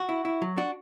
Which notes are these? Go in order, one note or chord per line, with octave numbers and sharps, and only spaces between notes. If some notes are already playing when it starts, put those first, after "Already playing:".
Already playing: F#4
E4
E4
F#3
D4 F#4